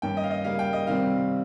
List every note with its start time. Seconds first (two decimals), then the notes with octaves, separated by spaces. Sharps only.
0.02 G2 D#3 A#3 C#4 G5
0.17 D#5
0.24 F5
0.30 D#5
0.44 C#3 G3 A#3 F5
0.59 G5
0.73 D#5
0.87 C3 D#3 G3 C4 F5